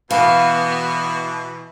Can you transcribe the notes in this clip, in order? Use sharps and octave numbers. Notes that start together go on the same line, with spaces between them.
B2 E3 B3 F#4 F5